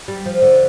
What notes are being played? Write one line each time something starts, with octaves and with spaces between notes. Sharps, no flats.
G3
F3
D3